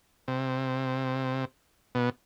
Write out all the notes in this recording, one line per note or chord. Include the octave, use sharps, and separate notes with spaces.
C3
B2